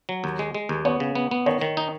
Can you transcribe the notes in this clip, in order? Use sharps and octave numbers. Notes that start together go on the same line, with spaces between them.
F#3
D#2
G#3
G#3
D#2
B3 C#5
C#3
B3
B3
D#3 C#5
D#3
D#4